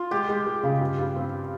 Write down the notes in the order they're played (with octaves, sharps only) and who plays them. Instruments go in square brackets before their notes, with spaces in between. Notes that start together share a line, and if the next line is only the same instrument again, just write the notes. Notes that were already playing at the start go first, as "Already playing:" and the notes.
Already playing: [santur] F4
[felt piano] G#3 [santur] G4
[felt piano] G#3
G#3
C#3
G2
G2
C4